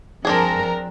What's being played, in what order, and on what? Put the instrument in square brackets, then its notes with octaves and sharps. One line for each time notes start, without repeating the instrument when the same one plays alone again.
[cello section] F3 A#4 [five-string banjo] C4 D4 G#4